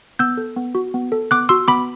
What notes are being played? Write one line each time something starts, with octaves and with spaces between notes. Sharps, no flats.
B3 E6 G6
A4
B3
F#4
B3
A4
B3 D6 F#6
F#4 C6 E6
B3 B5 D6